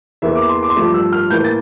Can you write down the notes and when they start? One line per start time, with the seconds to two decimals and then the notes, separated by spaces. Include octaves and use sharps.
0.22 E2 E3 A#3 E5
0.36 D6
0.49 C6
0.63 D6
0.70 C6
0.76 G2 F3 A3 D6
0.94 E6
1.13 F6
1.30 A2 E3 A#3 G6
1.44 A6